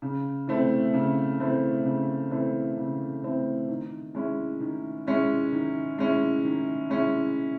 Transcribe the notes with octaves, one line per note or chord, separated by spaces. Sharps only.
C#3
E3 A3 C4
C#3
E3 A3 C4
C#3
E3 A3 C4
C#3
E3 A3 C4
D#3
G#3 C#4 E4
D#3
G#3 C#4 E4
D#3
G#3 C#4 E4
D#3
G#3 C#4 E4